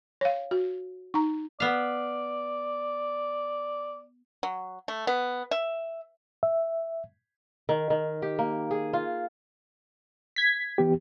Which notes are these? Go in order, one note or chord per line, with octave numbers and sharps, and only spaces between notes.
C#5 F5
F#4
D#4 A#5
B3 D5 F5
F#3
A3
B3
E5
E5
D#3
D#3
G4
A#3
G#4
F4
G#6 B6
E3 B3 G4